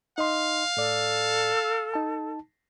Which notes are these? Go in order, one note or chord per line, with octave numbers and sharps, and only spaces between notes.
D#4 D#5 F5 C6
A2 A4 D5
E6
D#4 A5